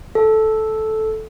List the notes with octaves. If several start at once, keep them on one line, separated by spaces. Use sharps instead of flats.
A4